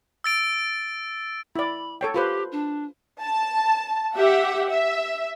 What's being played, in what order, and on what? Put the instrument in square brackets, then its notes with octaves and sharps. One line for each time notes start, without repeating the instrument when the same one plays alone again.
[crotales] E6 A6 D7
[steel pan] E4 D5 [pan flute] B5
[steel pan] A4 C#5 G5
[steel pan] F4 B4 C5 [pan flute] G4
[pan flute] D4
[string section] A5
G4 E5 F#5
E5